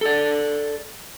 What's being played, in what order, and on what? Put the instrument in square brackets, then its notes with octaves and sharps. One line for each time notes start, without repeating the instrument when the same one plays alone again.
[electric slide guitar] A4 D5